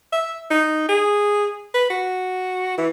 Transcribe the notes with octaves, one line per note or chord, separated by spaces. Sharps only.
E5
D#4
G#4
B4
F#4
E3